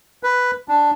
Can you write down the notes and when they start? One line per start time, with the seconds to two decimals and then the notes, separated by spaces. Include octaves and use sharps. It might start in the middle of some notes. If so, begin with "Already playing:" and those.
0.23 B4
0.68 D4